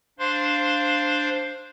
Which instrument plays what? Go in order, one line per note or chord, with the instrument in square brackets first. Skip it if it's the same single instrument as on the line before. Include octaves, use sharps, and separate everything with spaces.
[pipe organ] D4 C5 F5 C6